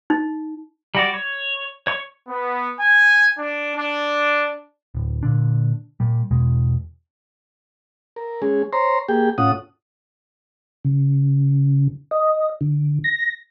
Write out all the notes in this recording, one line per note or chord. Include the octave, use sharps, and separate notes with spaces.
D#4
G3 F#4 D5
C#5
C#5 C#6
B3
G#5
D4
D4
D1
A#2 D3 D4
A#2 G3
E2 B2 G#3
A#4
G#3 C#4 G#4
C5 C#5 A#5 C6
A#3 G4 G#4 G5
A2 C#4 F4 F#5 D#6
C#3
D#5
D3
A#6